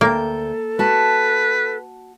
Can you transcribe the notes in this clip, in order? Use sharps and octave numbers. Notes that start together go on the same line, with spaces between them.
D2 A#3 A4 G5
F#4 B4 A5